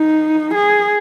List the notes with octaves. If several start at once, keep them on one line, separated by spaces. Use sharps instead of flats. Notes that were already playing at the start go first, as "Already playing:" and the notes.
Already playing: D#4
G#4